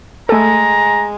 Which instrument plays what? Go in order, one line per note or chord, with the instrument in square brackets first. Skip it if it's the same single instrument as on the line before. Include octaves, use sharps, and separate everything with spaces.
[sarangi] G#3 [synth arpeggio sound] A3 A4 [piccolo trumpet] A#5